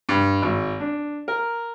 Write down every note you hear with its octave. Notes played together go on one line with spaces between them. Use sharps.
G2
G#1
D4
A#4